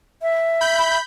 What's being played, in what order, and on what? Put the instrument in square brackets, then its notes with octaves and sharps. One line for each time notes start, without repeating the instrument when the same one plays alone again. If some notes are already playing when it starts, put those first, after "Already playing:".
[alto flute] E5
[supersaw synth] B5 G6